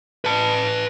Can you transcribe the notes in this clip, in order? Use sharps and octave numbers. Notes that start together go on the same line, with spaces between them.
B4 A5